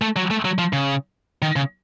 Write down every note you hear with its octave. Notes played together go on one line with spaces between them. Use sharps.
A3
F#3
A3
F#3
F3
C#3
D#3
C#3